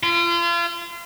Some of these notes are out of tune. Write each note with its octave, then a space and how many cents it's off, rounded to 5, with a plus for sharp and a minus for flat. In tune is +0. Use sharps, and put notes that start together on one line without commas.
F4 -35